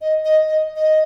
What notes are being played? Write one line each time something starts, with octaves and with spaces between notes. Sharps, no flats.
D#5
D#5
D#5
D#5